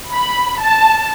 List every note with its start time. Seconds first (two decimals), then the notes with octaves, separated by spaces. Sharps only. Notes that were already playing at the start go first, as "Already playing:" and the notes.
0.13 B5
0.61 A5